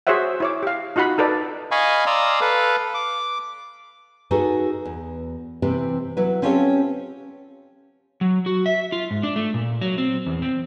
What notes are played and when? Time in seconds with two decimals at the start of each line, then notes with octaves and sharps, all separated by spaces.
0.07 F#4 G#4 C5 C#5 E5 F#5
0.40 E4 C#5 D6
0.63 G4 F5
0.96 D#4 F4 F#4 F#5 B5
1.18 D#4 A4 B4 D5
1.71 D#5 F5 G#5 B5 C#6
2.06 D5 F5 A#5 C6 D#6 E6
2.41 A4 B4 F5
2.94 D6
4.31 D#4 F#4 G#4 A4 B4
4.85 E2
5.62 C3 E3 C4 G4 B4
6.17 F#3 E4 B4
6.42 C4 C#4 F4 G4 A4 C#5
8.21 F#3
8.46 F#4
8.66 E5
8.92 F4
9.11 G#2
9.23 D4
9.36 A3
9.54 A#2
9.82 F#3
9.98 C4
10.26 E2
10.42 C4